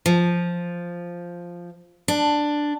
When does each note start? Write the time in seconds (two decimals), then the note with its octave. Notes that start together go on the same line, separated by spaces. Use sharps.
0.06 F3
2.08 D4